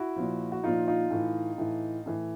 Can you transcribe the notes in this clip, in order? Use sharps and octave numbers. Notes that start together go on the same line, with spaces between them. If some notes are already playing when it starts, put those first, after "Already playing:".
Already playing: E4 F#4
A#2 F3
F#4
A#2 F3 D#4 F4
D#4 F4
A2 E3
A2 E3
A2 E3